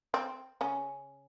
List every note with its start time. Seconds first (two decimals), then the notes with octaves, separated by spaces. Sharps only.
0.14 C4
0.61 C#3 C#4